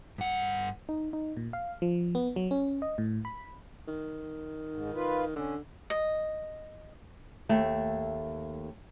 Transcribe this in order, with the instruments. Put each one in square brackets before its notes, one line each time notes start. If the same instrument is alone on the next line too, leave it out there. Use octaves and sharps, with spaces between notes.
[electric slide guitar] G2 F#5
[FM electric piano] D#4
D#4
A#2
F5
F3
B3
F#3
C#4
D#5
A2
B5
[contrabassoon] D#3
[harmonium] G#2
F4 B4
[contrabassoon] D3 [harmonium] C#4
[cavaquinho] D#5
[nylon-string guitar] D#2 A3